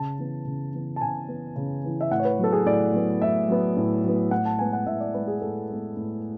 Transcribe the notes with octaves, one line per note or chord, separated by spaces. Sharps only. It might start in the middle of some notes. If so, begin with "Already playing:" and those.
Already playing: C#3 A5
E3 B3
C#3
E3 B3
A5
C#3 G#5
E3 B3
C#3
E3 B3
E5
A2 F#5
C#5
B4
F#3 B3 A4
G#4
A2 D5
F#3 B3
A2 E5
F#3 B3
A2
F#3 B3
A2 F#5
A5
G#3 B3 G#5
F#5
A2 E5
D5
G#3 B3 B4
G#4
A2 A4
G#3 B3
A2